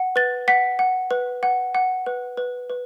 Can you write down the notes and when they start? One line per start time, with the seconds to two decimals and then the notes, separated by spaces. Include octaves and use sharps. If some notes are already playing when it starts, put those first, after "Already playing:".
Already playing: F#5
0.16 B4 A6
0.48 F#5 B6
0.79 F#5
1.11 B4
1.43 F#5
1.75 F#5
2.06 B4
2.37 B4
2.70 B4